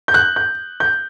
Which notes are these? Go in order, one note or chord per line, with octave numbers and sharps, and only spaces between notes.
G6
F#6
G6
G6